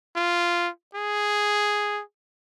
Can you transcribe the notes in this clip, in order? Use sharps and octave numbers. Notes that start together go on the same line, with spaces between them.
F4
G#4